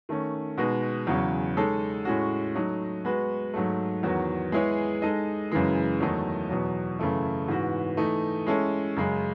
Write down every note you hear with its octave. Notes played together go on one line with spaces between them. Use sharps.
D#3 A3 C#4
B2 G#3 B3 D#4 F#4
E2 C#3 F#3 C#4
G#3 D#4 A4 C#5
A2 G#3 C#4 F#4
F#3 A3 D#4
G#3 B3 F#4 B4
G#2 F#3 A3
E2 D#3 F#3 B3 F#4
G#3 B3 E4 G#4 C#5
G#3 D#4 A4 D#5
F#2 C#3 E3 G#3
E2 D#3 F#3 A3 D#4
E2 B2 F#3
F#2 C#3 E3 A3 E4
G#2 E3 B3 F#4
E3 A3 D#4
G#3 C#4 E4 A4
F#2 C#3 G#3